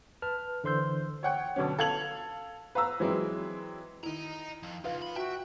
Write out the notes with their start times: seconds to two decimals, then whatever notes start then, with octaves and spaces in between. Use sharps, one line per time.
0.22 B4 A5 F6
0.64 D3 E3 C5 C6 E6 G6
1.23 C#5 F#5 G5
1.56 B2 D3 F#3 C#4
1.79 A4 F5 G#6 F7 F#7
2.75 B4 F5 A#5 E6
3.00 E3 F#3 G#3 C4 E4
4.03 D#3 E4 D#5 A#5
4.63 F2
4.84 C#2 F4 B4 F5
5.02 B3 B5
5.16 F#4 E5 G5